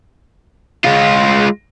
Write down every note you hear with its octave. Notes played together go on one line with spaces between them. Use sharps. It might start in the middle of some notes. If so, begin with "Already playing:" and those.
G#3 F4